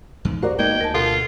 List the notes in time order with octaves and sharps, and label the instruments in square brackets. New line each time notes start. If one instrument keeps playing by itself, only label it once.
[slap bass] E2 G#2
[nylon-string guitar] F#4 A#4 D5 [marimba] C5
[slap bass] G#3 A#3 B3 [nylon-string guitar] D#4 [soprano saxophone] G5 [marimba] G#6
[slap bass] D2 [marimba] A#4 G#5 A5
[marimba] B2 [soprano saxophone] F4 [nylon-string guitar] A4 F#5